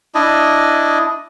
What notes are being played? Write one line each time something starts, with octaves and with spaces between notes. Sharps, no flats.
D4 E4 D#5